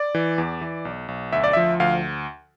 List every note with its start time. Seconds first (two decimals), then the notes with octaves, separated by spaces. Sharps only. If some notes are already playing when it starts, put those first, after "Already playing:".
Already playing: D5
0.15 E3
0.38 E2
0.61 E3
0.85 B1
1.08 B1
1.32 D2 E5
1.44 D5
1.53 F3 E5
1.80 D2 F5